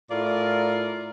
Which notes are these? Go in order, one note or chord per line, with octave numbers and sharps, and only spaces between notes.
A2 F4 A#4 D5